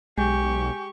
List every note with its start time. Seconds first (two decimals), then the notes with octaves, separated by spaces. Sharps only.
0.18 B1 G#3 G4 G#5 C#6 G6